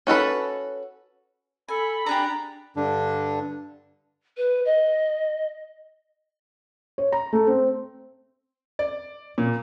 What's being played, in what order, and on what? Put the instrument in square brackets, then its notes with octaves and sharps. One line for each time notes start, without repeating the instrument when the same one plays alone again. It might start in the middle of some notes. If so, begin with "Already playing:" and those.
[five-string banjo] C#4 F#4 A4 B4
[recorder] A4 [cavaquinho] G#5 [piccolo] B5
[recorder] D4 [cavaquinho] G4 G#4 D5 [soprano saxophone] A#5
[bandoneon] G2 D3 D4
[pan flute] B4
D#5
[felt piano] C#5
A#5
A3
C4
D5
A#2